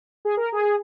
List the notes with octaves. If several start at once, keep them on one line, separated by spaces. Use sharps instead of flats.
G#4
A#4
G#4